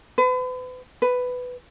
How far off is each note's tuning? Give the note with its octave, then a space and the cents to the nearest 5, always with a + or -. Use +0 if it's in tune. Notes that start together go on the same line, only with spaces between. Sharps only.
B4 +40
B4 +10